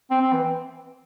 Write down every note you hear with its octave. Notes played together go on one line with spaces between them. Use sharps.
C4
C4
E3